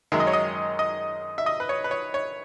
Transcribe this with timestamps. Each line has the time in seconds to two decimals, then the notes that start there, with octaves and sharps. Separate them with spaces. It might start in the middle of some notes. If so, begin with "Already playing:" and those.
0.12 F#2 D#3 G#3 E5
0.20 D#5
0.27 C#5
0.33 D#5
0.79 D#5
1.38 E5
1.46 D#5
1.60 B4
1.69 C#5
1.84 B4
1.91 C#5
2.14 C#5